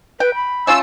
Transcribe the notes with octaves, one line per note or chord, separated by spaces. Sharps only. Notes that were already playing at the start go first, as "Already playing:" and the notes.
B4 G5
B5
A3 C#4 F4 E6